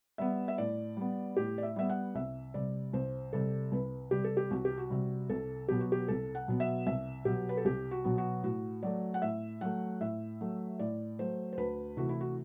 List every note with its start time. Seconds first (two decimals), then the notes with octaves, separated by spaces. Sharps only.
0.18 G3 B3 E5
0.48 E5
0.58 A2 D5
0.97 G3 B3
1.37 A2 G4
1.58 D5
1.63 E5
1.76 G3 B3 E5
1.90 F#5
2.15 C2 E5
2.54 C3 G3 D5
2.93 C2 C5
3.33 C3 G3 A4
3.72 C2 B4
4.11 C3 G3 G4
4.24 A4
4.37 G4
4.50 C2 F#4
4.65 G4
4.78 F#4
4.90 C3 G3
5.29 C2 A4
5.68 B2 F#3 B3 G4
5.80 F#4
5.92 G4
6.08 C2 A4
6.35 F#5
6.48 B2 F#3 B3
6.60 E5
6.86 C2 E5
7.25 B2 F#3 B3 G4
7.49 B4
7.57 A4
7.65 C2 G4
7.91 F#4
8.04 B2 F#3 B3
8.18 F#4
8.43 A2 F#4
8.83 F#3 A3 D5
9.14 F#5
9.22 A2 E5
9.61 F#3 A3 F#5
10.01 A2 E5
10.41 F#3 A3
10.79 A2 D5
11.19 F#3 A3 C5
11.53 C5
11.57 D2 B4
11.97 C3 E3 A3 F#4
12.09 E4
12.21 F#4